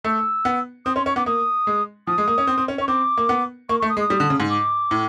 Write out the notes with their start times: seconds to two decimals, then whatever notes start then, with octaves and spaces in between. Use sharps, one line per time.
0.05 A3 E6
0.45 B3
0.86 C4 D#6
0.96 C#4 C6
1.06 C#4 C#6
1.16 B3 D6
1.26 A#3 D#6
1.67 G#3
2.07 F3 D#6
2.18 G#3
2.28 A#3
2.38 C#4
2.47 C4
2.58 C4
2.68 C#4
2.78 C#4
2.81 C#6
2.88 C4 D6
3.18 A#3
3.29 B3
3.69 A#3 C#6
3.80 C#6
3.82 A3
3.90 D#6
3.97 G#3
4.00 D#6
4.10 G3
4.20 D3
4.30 C#3
4.40 G#2
4.50 D6
4.91 A2